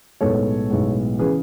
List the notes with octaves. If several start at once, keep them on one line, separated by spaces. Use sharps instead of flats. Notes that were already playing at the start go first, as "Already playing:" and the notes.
B1 A2 G#3 B3 A4 C#5
B1 A2 G#3 B3
C#3 E3 G#4 B4